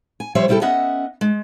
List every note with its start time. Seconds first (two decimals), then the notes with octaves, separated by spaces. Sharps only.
0.20 G#5
0.35 F3 G3 C5 C#5 E5
0.48 C3 G3 E4 F4 G4 A4
0.61 B3 C#4 D#5 E5 F#5
1.21 G#3